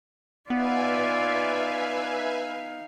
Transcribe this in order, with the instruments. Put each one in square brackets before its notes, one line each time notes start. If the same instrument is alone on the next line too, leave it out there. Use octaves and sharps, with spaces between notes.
[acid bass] B3 [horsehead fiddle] D#4 F5 [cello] F4 D5 [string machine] B4 E5 G#5